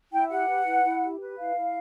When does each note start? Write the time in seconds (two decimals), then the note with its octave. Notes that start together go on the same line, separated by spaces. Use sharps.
0.12 E4 G5
0.29 G4 F#5
0.48 B4
0.66 E4
0.84 E4
1.02 G4
1.20 B4
1.38 E4 F5
1.56 E4